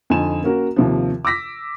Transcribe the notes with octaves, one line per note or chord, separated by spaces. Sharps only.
F2 D3 D#4 G#5 E7
A#3 C#4 F#4 A#4
D#2 C3 F3
D6 E6 A#6 B6